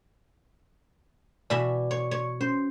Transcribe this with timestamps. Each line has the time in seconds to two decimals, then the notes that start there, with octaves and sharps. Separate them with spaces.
1.50 B2 E3 D5 E5
1.91 C#5
2.11 C#5
2.41 C#4 C5